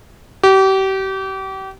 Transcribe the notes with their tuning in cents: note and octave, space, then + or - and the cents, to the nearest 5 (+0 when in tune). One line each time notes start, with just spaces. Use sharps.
G4 -35